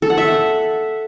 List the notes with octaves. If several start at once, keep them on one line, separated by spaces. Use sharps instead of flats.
A4
F#5
E5